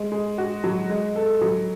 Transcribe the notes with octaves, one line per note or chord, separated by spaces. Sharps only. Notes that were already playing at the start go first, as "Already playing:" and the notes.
Already playing: G#3
G#3
F#4
F#3
G#3
A4
F#3